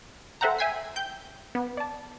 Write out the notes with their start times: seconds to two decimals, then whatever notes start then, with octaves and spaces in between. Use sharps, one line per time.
0.41 A4 C5 E5 F#5 G5 A#5
0.59 E5 G5 G#5 B6 C7
0.96 G5 G6
1.55 B3
1.77 D5 A5